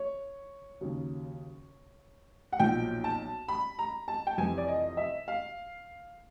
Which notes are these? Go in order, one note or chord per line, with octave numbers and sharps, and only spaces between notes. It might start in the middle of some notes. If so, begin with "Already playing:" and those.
Already playing: C#5
D#2 C#3 F#3
F#5
B1 A#2 F3 G5
A5
B5
A#5
A5
G5
F2 C3 E3 G#5
D5
D#5
E5
F5